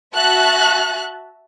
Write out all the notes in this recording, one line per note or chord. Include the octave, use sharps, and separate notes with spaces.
F#4 E5 A5 F#6